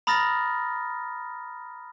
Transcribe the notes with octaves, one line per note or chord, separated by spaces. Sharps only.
A#5 B5 D#6 F6 A6 A#6